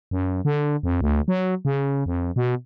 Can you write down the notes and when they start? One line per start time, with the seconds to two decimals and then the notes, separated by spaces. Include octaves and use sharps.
0.11 F#2
0.45 D3
0.83 F2
1.01 D2
1.28 F#3
1.65 C#3
2.06 F2
2.36 B2